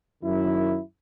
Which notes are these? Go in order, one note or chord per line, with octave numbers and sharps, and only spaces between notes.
F#2 D#3 E4